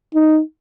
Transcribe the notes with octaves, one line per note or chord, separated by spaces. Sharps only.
D#4